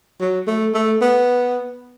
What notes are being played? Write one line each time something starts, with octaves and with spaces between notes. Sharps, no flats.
F#3
A3
A3
B3